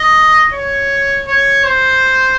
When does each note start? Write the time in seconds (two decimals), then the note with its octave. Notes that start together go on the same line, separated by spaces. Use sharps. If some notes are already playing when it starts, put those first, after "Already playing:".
Already playing: D#5
0.53 C#5
1.27 C#5
1.64 C5